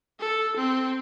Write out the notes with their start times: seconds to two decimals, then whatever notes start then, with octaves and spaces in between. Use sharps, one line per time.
0.20 A4
0.57 C4